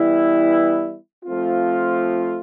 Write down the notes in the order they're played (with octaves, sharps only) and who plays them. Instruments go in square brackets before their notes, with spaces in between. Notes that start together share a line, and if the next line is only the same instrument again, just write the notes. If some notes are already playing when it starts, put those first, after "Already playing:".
Already playing: [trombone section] E3 G3 B3 E4
F3 A3 C4 F4